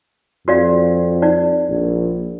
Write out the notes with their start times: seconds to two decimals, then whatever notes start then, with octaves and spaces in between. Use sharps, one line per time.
0.48 F2 F#4 D5 F5
1.22 D#4 D5
1.69 A#1